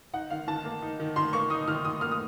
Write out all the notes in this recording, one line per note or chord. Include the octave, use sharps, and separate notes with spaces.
D#4 F#5
D#3 F5
D#3 A5
A#3
D#4
D#3
D#3 C6
A#3 C#6
D#4 D#6
D#3 F6
D#3 D#6
A#3 F6
D#6